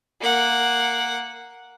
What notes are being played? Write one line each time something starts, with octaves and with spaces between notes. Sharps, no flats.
A#3 F#5